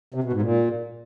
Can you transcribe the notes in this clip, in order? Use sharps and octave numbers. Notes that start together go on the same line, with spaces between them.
C3
B2
G#2
A#2